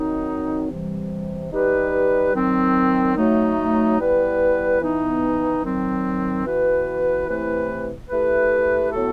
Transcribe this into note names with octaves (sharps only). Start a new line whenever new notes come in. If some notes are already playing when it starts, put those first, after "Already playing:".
Already playing: D#3 F#3 C4 D#4
C3 E3 G3
G3 D#4 G4 B4
D#3 F#3 C4
F#3 A3 D#4
G3 B3 E4 B4
E3 B3 D#4
D#3 F#3 C4
E3 B3 F#4 B4
C3 E3 A3 E4 B4
A3 E4 G4 B4
A2 F#3 B3 F#4 A4